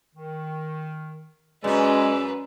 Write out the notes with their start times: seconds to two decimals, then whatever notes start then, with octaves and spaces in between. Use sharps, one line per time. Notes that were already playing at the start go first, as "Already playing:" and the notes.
0.16 D#3
1.64 F#2 G#3 C#4 B4 D5 E6